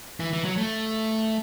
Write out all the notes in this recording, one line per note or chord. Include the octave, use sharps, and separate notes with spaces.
E3
E3
F#3
A3